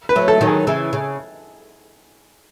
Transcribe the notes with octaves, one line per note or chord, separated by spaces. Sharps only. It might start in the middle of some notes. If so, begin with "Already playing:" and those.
B4
F#3 A3
A4
D#3 F#3
G#4
C#3 E3
C#3